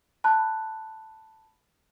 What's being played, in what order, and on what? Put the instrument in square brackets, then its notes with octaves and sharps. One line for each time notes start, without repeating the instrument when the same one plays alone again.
[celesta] A5 B5 F#6